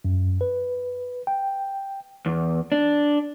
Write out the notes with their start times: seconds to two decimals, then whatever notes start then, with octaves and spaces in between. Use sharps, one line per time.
0.05 F#2
0.41 B4
1.27 G5
2.26 E2
2.72 D4